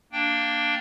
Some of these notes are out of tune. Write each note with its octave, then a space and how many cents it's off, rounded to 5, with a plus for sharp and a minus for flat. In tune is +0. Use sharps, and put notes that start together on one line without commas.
A#3 +0 D4 +0 G5 +0